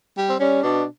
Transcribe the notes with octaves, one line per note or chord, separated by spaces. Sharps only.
G3
C4
G3 C#4
B2 D4